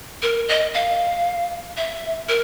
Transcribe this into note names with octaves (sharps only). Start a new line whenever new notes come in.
A#4
D#5
F5
E5
A#4